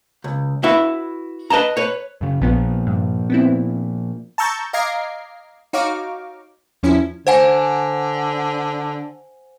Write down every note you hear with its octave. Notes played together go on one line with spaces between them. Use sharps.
C#2
E4 F#4 B4 E5
B4 D#5 A5 A#5
B4 C#5
F#2 C#3
A#1 A#2 F3 B3
G2
B3 C4 E4
A5 A#5 C#6 E6 G6 A6
D#5 F5 A#5 D6 G#6 C7
D#4 F#4 C#5 F5 A#5 D6
E2 F3 C#4 E4
D3 C5 F#5 G#5